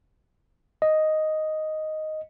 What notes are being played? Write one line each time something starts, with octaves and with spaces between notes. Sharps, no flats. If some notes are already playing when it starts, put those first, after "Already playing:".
D#5